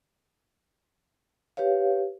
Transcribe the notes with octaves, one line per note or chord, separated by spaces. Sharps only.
G4 B4 C#5 F5